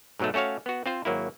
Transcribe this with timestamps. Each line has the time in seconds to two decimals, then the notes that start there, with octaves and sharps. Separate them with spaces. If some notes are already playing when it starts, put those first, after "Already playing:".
0.19 G#2 B2 F#3 G#3 A3
0.34 A3 C#4 F#4 C#5 F5
0.66 B3 F#4
0.86 C4 F4 C5
1.05 G#1 F#3 A#3 E4